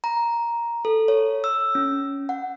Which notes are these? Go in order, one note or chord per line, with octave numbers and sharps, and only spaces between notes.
A#5
A4
C#5
E6
C#4
F#5